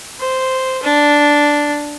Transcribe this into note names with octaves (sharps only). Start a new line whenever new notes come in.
C5
D4